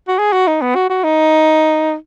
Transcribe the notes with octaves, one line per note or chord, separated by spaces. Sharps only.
F#4
G#4
F#4
D#4
B3
F#4
F#4
D#4